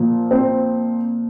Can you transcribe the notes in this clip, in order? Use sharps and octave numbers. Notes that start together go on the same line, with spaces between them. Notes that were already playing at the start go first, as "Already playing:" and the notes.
Already playing: A#2 F3
C4